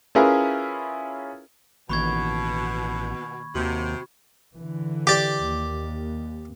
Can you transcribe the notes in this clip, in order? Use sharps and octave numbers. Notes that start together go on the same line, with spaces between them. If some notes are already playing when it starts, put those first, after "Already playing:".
C#4 E4 F4 G#4 A#4 B4
A1 B2 D#3 A#3 B5 C#6 G#6
D#2 C3 F#4
D3 E3
G4 D5
D#2